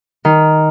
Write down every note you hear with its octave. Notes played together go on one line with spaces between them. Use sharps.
D#3